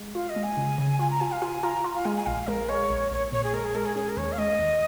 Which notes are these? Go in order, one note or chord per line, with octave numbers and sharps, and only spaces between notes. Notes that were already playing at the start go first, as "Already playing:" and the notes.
Already playing: G#3
F4 F5
D#5
G#3
G#5
C#3
C#3
F4 G#5
A#5
F4 G#5
F5
F4 G#5
F4 A#5
F4
F5
G#3 G#5
G#5
A#1 F5
G#3 A#4
G#3 C#5
A#1
A#1 C#5
A#2 C#5
G#4
G#3 A#4
G#4
G#3 A#4
G#4
C#4 G#4
A#4
D#2 C#5
F5
G#3 D#5
D#2